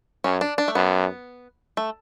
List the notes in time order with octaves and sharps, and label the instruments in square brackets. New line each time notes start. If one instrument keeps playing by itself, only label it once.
[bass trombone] F#2 [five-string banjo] C#4
[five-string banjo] D4
D4
A3
[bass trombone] F#2 [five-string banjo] B3
[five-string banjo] A3